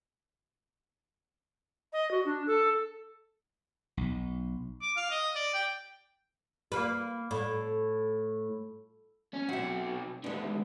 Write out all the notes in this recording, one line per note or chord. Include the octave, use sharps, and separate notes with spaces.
D#5
F#4
D4
A4
B1
D6
F5
D#5
D5
G5
A#3 B4
A2
C#4
B1 C4 F#4 E5
D#2 D3 G#3 B3